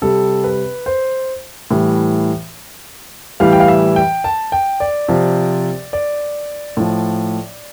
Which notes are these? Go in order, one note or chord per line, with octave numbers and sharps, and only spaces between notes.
C3 G3 A4
B4
C5
A2 E3 G3
A2 E3 G3 F5
G5
F5
E5
G5
A5
G5
D5
C3 F3
D5
A2 F3